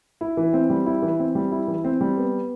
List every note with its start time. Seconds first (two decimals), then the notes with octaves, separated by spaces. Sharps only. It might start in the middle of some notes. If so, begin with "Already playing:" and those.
0.21 E4
0.37 E3
0.53 C4
0.70 G3
0.86 E4
1.02 E3
1.19 C4
1.35 G3
1.52 E4
1.68 E3
1.84 C4
2.01 G3
2.18 B3